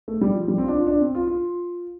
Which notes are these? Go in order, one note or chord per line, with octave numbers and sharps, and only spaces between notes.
A3
G3
F3
G3
C4
F4
D4
F4
D4
C4
F4
F4